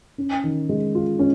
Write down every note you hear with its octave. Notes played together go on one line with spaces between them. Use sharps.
C#4
D#3
G#3
F4
C#4